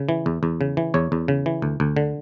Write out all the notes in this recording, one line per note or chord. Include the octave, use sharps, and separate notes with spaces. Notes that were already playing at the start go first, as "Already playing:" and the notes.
Already playing: C#3
E3
E2
E2
C#3
E3
E2 C#5
E2
C#3
E3
D2
D2
D3